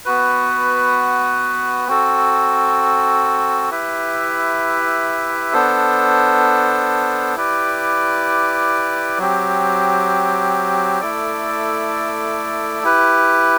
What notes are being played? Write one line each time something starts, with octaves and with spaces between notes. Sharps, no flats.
B3 F#4 B4
C4 F#4 A4
E4 G4 B4 E5
B3 D4 A4 C5
E4 G4 B4 D5
F#3 C4 G4
A3 E4 A4 D5
E4 G4 B4